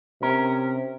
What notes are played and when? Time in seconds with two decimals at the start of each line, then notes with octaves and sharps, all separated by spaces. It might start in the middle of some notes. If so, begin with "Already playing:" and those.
0.22 C3 C#4 A#4